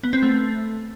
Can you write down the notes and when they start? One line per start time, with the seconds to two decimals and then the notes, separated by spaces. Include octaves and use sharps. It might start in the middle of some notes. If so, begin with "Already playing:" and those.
0.03 B3
0.13 C4
0.22 A3